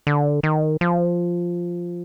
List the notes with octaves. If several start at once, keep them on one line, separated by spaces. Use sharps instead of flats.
D3
D#3
F3